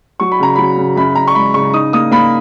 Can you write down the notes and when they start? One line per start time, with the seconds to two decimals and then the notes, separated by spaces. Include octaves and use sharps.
0.20 F#3 C#6
0.32 B5
0.39 C#3 A#5
0.56 F#3 B5
0.77 C#3
0.96 F#2 B5
1.15 F#2 A#5
1.27 C#6
1.35 G#3 B5
1.54 C#3 C#6
1.73 D#4 D#6
1.93 A#3 D#6
2.11 A#3 B5